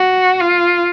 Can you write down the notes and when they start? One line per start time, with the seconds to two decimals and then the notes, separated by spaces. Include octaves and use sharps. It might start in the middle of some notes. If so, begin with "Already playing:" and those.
Already playing: F#4
0.40 F4